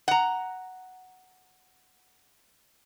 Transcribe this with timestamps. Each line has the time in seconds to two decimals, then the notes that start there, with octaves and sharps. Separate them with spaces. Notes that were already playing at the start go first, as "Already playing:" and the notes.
0.08 F#5 A#5